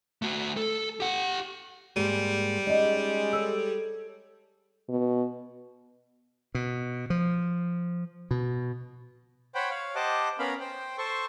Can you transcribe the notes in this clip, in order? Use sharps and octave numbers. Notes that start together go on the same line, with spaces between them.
A3 F#4
A4
G4 F#5
G#2 G3 G#3 A#3
G#3 C#4 D#4 D5 D#5
A4 C#5 E6
B2
B2
F3
B2
C5 C#5 F#5 G5 B5
C#5 F5
G4 C5 D#5 F#5 A5 D6
B3 C#4 A#4 F5 B5
C5 G5
A4 C5 C6 C#6